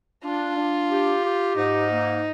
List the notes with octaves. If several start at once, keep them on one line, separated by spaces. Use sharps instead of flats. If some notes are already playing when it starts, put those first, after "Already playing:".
D4 F4
D4
G4
G4
G#2 D#4
A#3